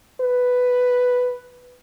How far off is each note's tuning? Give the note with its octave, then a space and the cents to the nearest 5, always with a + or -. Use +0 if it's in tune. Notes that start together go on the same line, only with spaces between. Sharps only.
B4 +5